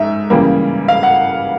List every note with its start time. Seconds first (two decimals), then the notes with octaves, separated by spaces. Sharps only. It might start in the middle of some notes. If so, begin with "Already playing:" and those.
Already playing: G#2 E5
0.30 C#3 E3 G3 A#3
0.88 F5
1.03 F#5